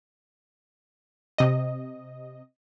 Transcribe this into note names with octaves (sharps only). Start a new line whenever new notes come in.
C3 D#5